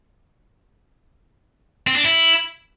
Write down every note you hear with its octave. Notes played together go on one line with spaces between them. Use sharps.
C4
D4
E4